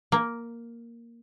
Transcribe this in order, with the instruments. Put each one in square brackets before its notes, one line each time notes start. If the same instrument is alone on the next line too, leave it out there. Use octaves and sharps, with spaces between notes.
[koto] A#3